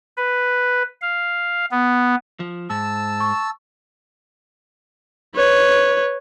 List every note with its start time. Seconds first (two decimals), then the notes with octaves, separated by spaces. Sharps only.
0.17 B4
1.02 F5
1.72 B3
2.40 F3
2.70 G#2 A5 E6
3.20 C#6
5.35 B4 C#5